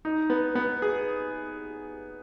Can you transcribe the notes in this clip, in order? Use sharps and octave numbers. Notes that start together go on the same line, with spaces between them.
D#4
B3
B3
G#4